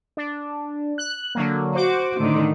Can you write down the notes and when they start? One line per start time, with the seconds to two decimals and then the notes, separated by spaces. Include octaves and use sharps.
0.17 D4
0.98 F#6
1.35 D3 F#3 A#3
1.75 F#4 C5 D6
2.18 A2 D3 D#3